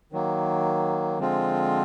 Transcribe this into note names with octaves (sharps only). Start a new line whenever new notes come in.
D#3 F#3 A#3
D3 F3 G#3 C4 F4